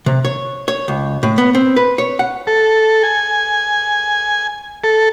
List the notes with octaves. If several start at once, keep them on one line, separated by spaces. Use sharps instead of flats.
C3
C#5
C#5
C#2
A2
B3
C4
B4
C#5
F#5
A4
G#5
A4